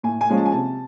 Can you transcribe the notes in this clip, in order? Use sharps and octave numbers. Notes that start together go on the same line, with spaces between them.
A2 G#5
G#5
F3 G#3 C#4
A5
G#5
C3 A5